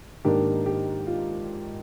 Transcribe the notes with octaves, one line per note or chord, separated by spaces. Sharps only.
G#2 D#3 A#3 D4 G4
G4
F4